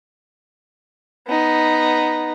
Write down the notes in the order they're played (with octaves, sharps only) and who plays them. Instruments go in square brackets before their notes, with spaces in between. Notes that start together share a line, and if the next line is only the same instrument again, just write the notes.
[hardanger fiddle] B3 D#4